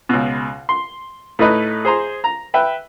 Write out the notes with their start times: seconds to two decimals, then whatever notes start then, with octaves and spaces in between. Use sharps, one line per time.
0.09 C#2 B2
0.69 C6
1.39 A2 A3 D#4 B4 D#5
1.85 G#4 C5 A#5 C6
2.24 A#5
2.54 B4 E5 G5